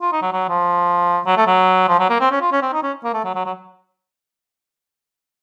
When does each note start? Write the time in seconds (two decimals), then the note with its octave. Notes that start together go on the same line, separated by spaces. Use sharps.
0.01 F4
0.12 D#4
0.22 F#3
0.32 F#3
0.49 F3
1.26 F#3
1.37 A3
1.47 F#3
1.88 F3
1.99 F#3
2.10 A#3
2.20 C4
2.31 C#4
2.41 F4
2.52 C#4
2.62 C4
2.73 D#4
2.82 C#4
3.04 A#3
3.13 A3
3.24 F#3
3.35 F#3
3.45 F#3